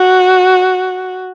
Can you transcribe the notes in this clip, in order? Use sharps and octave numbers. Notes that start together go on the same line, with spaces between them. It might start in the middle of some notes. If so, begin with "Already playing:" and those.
Already playing: F#4